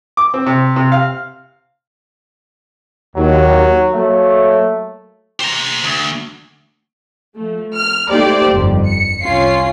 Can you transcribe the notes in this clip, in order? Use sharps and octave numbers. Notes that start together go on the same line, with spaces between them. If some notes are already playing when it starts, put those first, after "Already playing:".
D6
C4
C3
C3
F5
D#2 F#3
F#3 A3 A#3 C#5
C5 A#5
D2
F3 A3
F6
A3 A#3 D#4 G4 C5 D5
G1 F2
C#7
C2 C#4 F4 C7